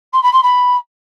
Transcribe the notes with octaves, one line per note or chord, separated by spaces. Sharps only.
C6
B5
C6
B5